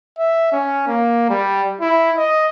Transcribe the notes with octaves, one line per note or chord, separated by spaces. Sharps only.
E5
C#4
A#3
G3
E4
D#5